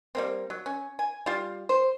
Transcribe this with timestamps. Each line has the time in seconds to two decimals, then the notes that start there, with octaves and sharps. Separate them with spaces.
0.15 G3 A#3 C4
0.50 F#3
0.66 C#4
0.99 G#5
1.26 G3 F4
1.69 C5